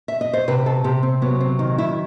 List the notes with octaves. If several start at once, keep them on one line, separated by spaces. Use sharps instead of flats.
E5
D#5
C5
C3 B4
A4
C3 G4
C4
F#3 B3
C4
D#3 D#4
E4